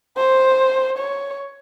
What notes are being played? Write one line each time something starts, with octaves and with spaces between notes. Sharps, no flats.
C5
C#5